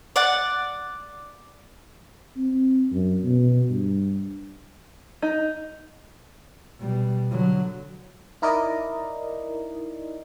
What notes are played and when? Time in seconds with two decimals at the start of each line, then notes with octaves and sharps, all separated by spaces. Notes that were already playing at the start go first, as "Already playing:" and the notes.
0.16 D5 F#5
2.36 C4
2.92 F#2
3.24 B2
3.69 G2
5.22 D#4
6.79 B2 G3
7.31 D3 F#3
8.42 D#4 E4 A#4 D5 D#5